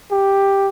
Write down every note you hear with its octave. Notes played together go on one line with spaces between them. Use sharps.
G4